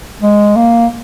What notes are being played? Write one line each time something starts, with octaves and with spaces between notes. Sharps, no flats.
G#3
A#3